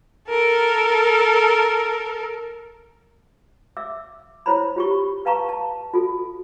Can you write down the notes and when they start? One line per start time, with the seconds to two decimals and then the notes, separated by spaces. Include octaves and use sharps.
0.29 A4 A#4
3.77 E5 D6 E6
4.46 E4 C5 C#5 A#5 B5
4.76 F4 G4 C#6
5.25 B4 F5 A5 A#5 C#6
5.49 A5
5.94 F4 F#4 A4